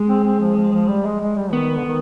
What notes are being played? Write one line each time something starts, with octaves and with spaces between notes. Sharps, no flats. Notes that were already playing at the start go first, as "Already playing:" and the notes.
Already playing: G#3
C4
C4
F3
F3
F3
G3
G#3
G#3
G3
D#3 B3
D3
D#3